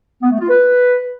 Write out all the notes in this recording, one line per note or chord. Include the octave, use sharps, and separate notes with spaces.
B3
A3
F4
B4